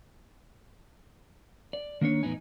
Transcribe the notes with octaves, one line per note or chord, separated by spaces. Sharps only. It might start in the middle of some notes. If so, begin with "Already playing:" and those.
D5
D#3 A#3 D4 C#5
E2 A2 B3 D#4 G#5